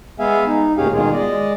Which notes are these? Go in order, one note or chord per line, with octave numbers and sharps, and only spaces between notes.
G#3 B3 G#4 E5 F5 G#5
D#4
D2 A#2 C#4 G4 G#4 F5
B2 D#3 G#3 F4 G#4
G#3 D5 D#5